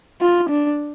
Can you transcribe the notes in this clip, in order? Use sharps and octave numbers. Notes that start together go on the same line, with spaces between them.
F4
D4